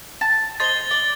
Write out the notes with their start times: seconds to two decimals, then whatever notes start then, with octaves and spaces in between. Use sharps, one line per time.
0.21 A5
0.60 C5 D#5 A6 G7
0.91 D5